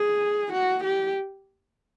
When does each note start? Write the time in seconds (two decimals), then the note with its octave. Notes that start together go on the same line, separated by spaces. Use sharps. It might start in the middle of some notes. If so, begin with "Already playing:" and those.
Already playing: G#4
0.53 F#4
0.83 G4